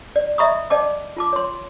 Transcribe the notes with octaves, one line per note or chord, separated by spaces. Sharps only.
D5
D#5 E5 A#5 B5 C#6 D#6
D5 D#5 G5 A5 D6
F4 A5 D6
C#5 C6